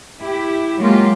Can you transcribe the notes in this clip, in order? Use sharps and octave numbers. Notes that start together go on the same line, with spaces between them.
E4 G4
F#3 G#3 A#3 F4 G4